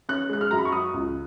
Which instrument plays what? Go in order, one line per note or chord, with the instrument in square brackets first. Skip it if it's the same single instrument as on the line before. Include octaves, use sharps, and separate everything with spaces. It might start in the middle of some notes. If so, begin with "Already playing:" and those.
[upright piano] C#4 F#6
G#3 F#6
F6
F#2 A#5
B5
C#6
F#3 D#6
C#2